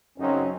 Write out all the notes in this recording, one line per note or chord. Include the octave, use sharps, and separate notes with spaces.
F#2 C#3 F#3 C4 C#4 D#4